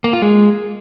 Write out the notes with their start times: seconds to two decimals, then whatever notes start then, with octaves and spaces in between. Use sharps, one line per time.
0.04 A#3
0.13 F4
0.22 G#3